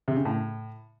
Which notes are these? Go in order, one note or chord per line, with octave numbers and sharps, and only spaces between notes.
C3
C#3
A2